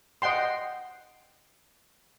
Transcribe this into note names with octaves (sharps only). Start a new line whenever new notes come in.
D#5 F#5 G5 C6